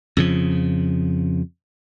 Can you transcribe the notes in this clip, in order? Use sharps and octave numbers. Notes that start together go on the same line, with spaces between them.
F2 C#3 F3